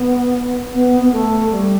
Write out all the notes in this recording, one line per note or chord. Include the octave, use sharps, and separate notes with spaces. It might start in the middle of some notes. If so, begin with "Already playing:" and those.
Already playing: B3
B3
B3
A3
G3